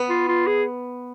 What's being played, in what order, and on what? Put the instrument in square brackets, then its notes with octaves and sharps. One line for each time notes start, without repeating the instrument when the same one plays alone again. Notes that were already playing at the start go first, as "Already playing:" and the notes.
Already playing: [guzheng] B3
[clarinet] F4
F4
G#4